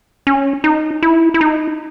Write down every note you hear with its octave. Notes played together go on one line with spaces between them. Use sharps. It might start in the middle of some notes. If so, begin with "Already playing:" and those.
C#4
D#4
E4
E4
D#4